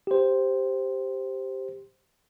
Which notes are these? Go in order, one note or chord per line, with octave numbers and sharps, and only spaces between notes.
G4 C5